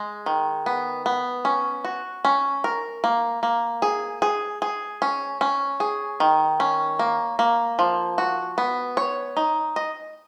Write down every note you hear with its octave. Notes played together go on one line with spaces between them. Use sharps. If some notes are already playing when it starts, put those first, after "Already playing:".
Already playing: G#3
D#3
B3
B3
C#4
F#4
C#4
A#4
A#3
A#3
G#4
G#4
G#4
C#4
C#4
G#4
D#3
C#4
A#3
A#3
F3
F#4
B3
C#5
D#4
D#5